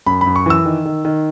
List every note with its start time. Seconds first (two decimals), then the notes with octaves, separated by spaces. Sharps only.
0.06 F#2 B5
0.21 F#2 B5
0.36 C#6
0.46 E3 E6
0.65 D#3
0.85 D#3
1.05 D#3